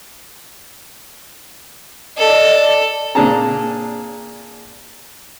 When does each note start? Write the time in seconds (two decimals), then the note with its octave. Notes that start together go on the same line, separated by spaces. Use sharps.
2.18 A4 D5 D#5
3.15 A#2 D4 G#4 A5 A#5